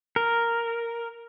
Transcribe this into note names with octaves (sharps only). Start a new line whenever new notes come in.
A#4